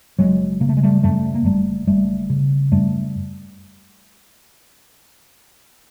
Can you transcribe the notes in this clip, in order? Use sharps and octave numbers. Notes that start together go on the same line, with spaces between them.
F#1 F#3 G#3
C#3 A#3
A3
G#3
G3 A3
F#2 G3 A3
A#3
F#1 G3 A3
F#1 G3 A3
C#3
F#2 G3 A3